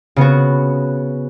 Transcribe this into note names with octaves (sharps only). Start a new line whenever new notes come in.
C#3 B3 F#4